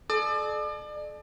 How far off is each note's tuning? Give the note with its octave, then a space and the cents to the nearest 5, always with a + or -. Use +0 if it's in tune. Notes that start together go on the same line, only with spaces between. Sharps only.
A4 -40 D5 +35